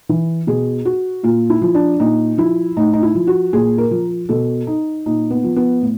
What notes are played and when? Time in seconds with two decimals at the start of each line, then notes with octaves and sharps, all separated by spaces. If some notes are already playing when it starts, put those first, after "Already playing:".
0.09 E3
0.47 B2 G#4
0.85 F#4
1.23 A#2 F4
1.50 E4
1.62 F3
1.74 D4
2.00 A#2 D#4
2.38 F3 E4
2.76 A2 D#4
2.93 D#4
3.03 E4
3.15 F3
3.27 F#4
3.53 A#2 G#4
3.78 A#4
3.91 F3
4.29 B2 A4
4.67 D#4
5.06 A#2 D#4
5.31 B3
5.44 F3
5.56 B3
5.82 A2